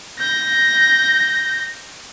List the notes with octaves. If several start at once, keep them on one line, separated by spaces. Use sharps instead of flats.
G6 A#6